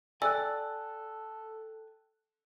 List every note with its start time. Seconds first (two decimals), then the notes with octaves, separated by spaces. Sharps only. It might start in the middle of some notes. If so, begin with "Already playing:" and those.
0.22 A4 D5 G5 G#5 E6 F#6